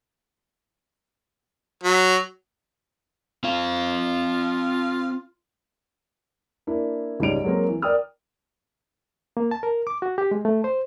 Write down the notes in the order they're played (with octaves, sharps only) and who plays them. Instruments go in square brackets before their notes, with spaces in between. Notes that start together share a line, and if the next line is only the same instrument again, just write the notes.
[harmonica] F#3
[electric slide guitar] C4 F5 [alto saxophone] F4
[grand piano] A#3 D4 E4
C#2 G#2 G3 C#4 D7 F7
F#3 G#3 A#3 C4 A#4
E3
A#4 D5 G5 D#6 F6
[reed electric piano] A#3
A5
A#4
D6
F#4
G4
G#3
A3
C5